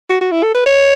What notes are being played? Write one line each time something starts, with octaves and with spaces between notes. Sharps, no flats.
F#4
F#4
E4
A4
B4
C#5